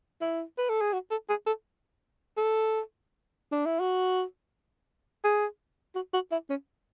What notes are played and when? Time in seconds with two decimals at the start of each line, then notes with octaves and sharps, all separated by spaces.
0.21 E4
0.58 B4
0.69 A4
0.81 G#4
0.93 F#4
1.11 A4
1.29 G#4
1.47 A4
2.37 A4
3.52 D4
3.66 E4
3.80 F#4
5.24 G#4
5.95 F#4
6.13 F#4
6.32 E4
6.50 C#4